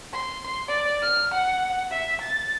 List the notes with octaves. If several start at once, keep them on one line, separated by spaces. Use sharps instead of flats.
C6
D5
F6
F#5
E5
A6